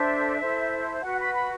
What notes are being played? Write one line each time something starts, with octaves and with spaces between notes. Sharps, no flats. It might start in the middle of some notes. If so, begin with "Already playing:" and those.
Already playing: D4 A4 C5 E5
E4 A4 C5
F#4 B4 F#5
B5
B5